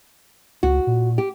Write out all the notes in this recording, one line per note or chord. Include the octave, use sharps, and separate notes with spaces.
C#2 F#4
A#2
G4